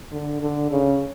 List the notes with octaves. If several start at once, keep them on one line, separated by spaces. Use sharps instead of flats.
D3
D3
C#3